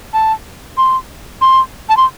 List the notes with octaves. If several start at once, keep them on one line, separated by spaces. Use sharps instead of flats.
A5
C6
C6
A5
C6